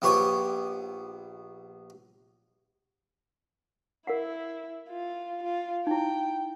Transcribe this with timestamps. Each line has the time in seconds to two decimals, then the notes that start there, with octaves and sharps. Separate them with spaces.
0.02 A#1 B3 G4 C#5 C#6 D#6
4.07 E4 A#4 F5 F#5
4.90 F4
5.44 F4
5.87 D#4 E4 G5